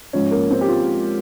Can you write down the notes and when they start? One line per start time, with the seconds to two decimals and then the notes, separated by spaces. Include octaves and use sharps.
0.13 G#2 F3 C#4
0.31 A#3
0.51 C4
0.61 G4
0.68 F4